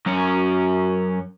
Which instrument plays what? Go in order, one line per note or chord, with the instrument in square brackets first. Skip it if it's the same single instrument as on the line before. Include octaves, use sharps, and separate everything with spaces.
[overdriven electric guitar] F#2 C#4